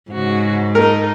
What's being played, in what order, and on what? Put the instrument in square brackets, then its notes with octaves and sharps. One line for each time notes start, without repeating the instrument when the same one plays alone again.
[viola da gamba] G#2 [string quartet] C#3 F#4
[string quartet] D#4 A4 [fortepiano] A#4